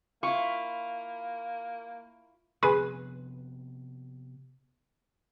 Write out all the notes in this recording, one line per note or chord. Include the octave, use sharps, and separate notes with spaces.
A#3 E4 F4 C#6
C3 F3 B3 G#4 B4 C6